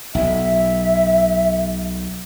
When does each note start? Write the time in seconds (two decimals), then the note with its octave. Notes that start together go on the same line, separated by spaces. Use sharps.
0.15 B1 E5